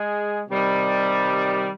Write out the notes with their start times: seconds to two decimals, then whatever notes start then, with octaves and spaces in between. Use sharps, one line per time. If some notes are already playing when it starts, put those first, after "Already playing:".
Already playing: G#3 G#4
0.49 C3 D#3 G3